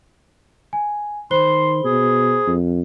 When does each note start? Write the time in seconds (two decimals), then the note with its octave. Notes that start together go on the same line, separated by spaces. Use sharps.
0.73 G#5
1.31 D#3 C5 B5 C6 G7
1.84 B2 G#4
2.47 F2